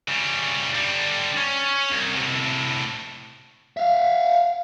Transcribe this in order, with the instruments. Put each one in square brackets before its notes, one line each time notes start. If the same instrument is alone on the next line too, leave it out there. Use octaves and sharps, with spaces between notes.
[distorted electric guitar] C#3 G3
D3 G3
C#4
C2
A2 C3
[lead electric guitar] E5 F5